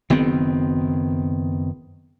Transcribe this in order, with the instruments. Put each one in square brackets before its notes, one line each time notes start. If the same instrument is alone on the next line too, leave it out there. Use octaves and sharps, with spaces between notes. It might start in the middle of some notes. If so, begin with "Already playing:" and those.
[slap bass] F#1 D#3 B3 C4